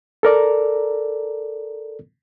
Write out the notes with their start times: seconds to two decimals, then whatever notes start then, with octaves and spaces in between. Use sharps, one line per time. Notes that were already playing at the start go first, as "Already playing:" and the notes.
0.23 A4 A#4 D5 A#5